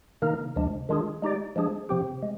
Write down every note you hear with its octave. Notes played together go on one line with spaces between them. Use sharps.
C3 D#3 A#3 D#4 A#4
D2 C3 F3 G#3 D4
D#3 G#3 D4 F4 G#4
G#3 D#4 G4 D5
F3 G#3 D4 G#4
C3 F3 C4 G4
G#3